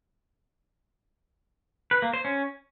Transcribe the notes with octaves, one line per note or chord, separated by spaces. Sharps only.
B4
A#3
C5
C#4